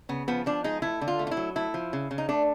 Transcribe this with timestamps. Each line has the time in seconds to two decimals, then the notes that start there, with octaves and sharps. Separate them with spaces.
0.09 C#3 B3
0.28 F3 B3
0.46 F3 D4
0.64 G#3 D#4
0.82 A3 E4
1.01 D3
1.08 F4
1.19 A3
1.27 F4
1.31 E4
1.37 F#3
1.56 A3 E4
1.74 F3
1.93 C#3
2.11 C#3
2.18 D#4
2.29 A3 D4